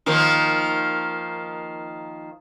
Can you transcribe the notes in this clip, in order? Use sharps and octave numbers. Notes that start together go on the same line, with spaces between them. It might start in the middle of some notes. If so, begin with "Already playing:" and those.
D#3 F3 A#3